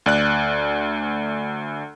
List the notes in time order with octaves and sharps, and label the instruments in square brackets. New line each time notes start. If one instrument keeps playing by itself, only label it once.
[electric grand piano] D2 D5 F#6